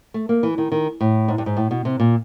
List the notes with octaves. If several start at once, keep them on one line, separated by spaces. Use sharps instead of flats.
A3
A#3
E3
D#3
D#3
A2
G#2
G2
G#2
A2
B2
C3
A#2